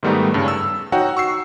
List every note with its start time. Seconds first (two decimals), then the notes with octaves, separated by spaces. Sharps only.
0.03 G#2 D#3 G3 A3 B3 D#4
0.34 G2 C#3 C#4 D4
0.48 E6
0.92 D#4 F#4 C#5 F#5 G5
1.17 C#6 E6 C7